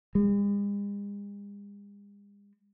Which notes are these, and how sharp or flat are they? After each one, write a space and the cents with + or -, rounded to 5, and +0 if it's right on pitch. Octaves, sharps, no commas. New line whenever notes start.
G#3 -45